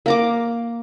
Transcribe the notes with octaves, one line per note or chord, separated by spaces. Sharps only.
A#3 A#5 D6